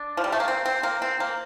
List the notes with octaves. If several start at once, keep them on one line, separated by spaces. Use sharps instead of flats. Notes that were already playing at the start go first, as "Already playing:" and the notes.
Already playing: D4
F3
G3
A3
A#3
C4
C4
A#3
C4
A#3